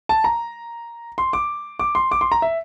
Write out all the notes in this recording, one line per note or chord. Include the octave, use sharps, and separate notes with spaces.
A5
A#5
C6
D6
D6
C6
D6
C6
A#5
E5